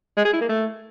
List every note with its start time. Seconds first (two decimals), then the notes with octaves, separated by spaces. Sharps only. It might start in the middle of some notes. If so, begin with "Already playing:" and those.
0.17 G#3
0.25 G#4
0.33 E4
0.41 A#3
0.49 A3